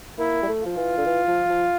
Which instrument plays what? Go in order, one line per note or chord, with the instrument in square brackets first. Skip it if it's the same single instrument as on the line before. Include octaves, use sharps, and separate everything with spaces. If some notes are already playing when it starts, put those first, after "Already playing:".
[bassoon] A#3 [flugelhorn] E4
[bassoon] G3
A3
[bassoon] F3 [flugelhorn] F4
[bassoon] E3
D3
E3
F3
F3